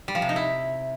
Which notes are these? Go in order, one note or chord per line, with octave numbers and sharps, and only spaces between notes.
G3
F3
C3
D#4
E4